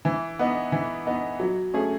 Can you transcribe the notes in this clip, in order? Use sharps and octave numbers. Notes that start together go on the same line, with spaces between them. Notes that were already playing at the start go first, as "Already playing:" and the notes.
E3
B3 D#4
E3
B3 D#4
F#3
A3 C#4 G#4